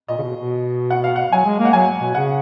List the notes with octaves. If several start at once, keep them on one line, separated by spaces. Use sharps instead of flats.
A#2 D#5
C#3
B2
B2
F#5
F5
F#5
F#3 G#5
G#3
A#3
F#5
F#3 G#5
B2
C#3 F#5